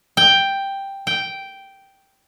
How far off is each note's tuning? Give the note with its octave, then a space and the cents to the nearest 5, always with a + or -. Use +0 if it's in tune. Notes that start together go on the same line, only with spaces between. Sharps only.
G5 +5
G5 -5